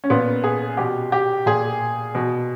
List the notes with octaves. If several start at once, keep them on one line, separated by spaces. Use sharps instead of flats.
C#4
A#2 B3
G#4
B2 G4
G4
A#2 G#4
B2